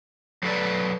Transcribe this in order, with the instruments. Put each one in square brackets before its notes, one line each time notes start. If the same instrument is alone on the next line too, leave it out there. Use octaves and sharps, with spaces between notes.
[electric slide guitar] F#3 A4 B4 D5